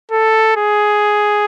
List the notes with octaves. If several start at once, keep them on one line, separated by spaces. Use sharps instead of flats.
A4
G#4